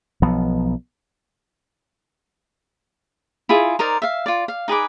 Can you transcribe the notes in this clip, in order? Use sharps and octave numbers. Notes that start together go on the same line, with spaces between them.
B1 F3 B3
E4 F4 G#4
D#4 A#4 C5 D5
E5 F5
F4 D5
F5
D#4 G#4 B4 D6